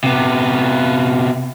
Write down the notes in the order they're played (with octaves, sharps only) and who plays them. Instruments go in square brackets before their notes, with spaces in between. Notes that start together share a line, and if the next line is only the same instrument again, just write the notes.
[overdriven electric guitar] C3 B3